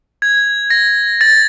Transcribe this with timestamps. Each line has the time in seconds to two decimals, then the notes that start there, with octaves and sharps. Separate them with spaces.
0.22 G#6
0.70 A#6
1.21 A6